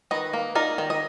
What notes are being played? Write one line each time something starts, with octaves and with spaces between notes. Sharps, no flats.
D#3 B4 D#5
A#3
D#4 A#4 D5
D#3
D#5